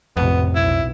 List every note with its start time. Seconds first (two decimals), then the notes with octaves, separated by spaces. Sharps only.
0.17 A1 F2 C3 B3
0.56 B1 E4